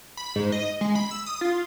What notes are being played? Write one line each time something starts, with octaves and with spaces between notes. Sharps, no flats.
B5
G#2
D#5
G#3
B5
E6
D#6
F4